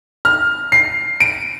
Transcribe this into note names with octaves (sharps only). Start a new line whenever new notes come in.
F6
C7
D7